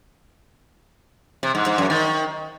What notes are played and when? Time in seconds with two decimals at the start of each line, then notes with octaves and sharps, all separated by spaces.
1.43 C3
1.55 G#2
1.66 G#2
1.78 F#2
1.90 D#3